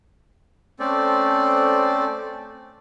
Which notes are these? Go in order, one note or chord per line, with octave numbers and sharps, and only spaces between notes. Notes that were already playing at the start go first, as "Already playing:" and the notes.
A3 C4 C#4 A4 C5 D5